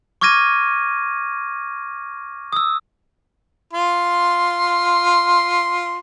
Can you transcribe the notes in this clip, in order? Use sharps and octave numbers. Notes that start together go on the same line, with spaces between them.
C#6 D6 F6 G#6 A#6 D#7
D#6 E6
F4 C6